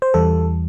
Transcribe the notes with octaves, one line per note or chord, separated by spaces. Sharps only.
C5
E2 E3 G3 A4